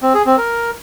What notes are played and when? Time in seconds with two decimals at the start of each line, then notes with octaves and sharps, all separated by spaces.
0.02 C4
0.14 G#4
0.26 C4
0.38 A#4